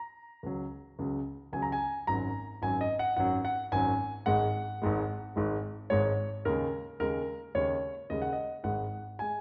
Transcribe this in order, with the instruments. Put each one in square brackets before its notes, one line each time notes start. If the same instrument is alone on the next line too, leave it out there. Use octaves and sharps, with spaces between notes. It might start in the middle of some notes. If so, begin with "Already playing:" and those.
Already playing: [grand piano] A#5
C#2 C#3 F#3
C#2 C#3 F#3
C#2 C#3 F#3 G#5
A#5
G#5
G#1 F#2 F#3 A#5
G#1 F#2 F#3 G#5
D#5
F#5
G#1 F#2 F#3 F#5
F#5
G#1 F#2 F#3 G#5
G#1 G#2 G#3 F#5
G#1 G#2 G#3
G#1 G#2 G#3
G#1 G#2 G#3 C#5
D#2 C#3 G#3 A#4
D#2 C#3 G#3 A#4
D#2 C#3 G#3 C#5
D#2 C#3 G#3 D#5
F#5
D#5
G#1 G#2 G#3 F#5
G#3 G#5